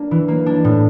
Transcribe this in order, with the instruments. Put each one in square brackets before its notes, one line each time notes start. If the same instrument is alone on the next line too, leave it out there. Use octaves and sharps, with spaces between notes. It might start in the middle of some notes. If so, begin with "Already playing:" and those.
Already playing: [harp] A#3 D4
E3
A#3
D4
A2